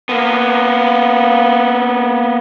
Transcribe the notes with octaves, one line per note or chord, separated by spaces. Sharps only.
A#3 B3